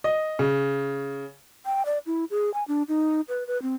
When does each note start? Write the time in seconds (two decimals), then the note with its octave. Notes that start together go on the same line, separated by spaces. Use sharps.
0.04 D#5
0.39 C#3
1.66 G5
1.86 D5
2.06 E4
2.31 G#4
2.54 G#5
2.68 D4
2.88 D#4
3.29 B4
3.47 B4
3.62 C4